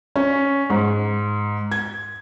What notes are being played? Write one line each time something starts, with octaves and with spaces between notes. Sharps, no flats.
C#4
G#2
G#6